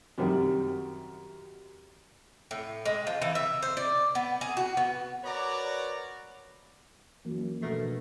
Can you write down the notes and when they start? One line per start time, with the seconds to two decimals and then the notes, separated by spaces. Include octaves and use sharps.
0.18 F#2 C3 D#3 G3
2.51 A2
2.85 G#3
3.07 F3
3.22 E3
3.35 E5
3.63 C5
3.77 D5
4.15 B3
4.41 G#4
4.57 F#4
4.77 B3
5.24 F#4 A#4 B4 C#5 D5 A#5
7.25 F#2 E3 F3 A#3
7.62 D2 B2 A3 A#4 C7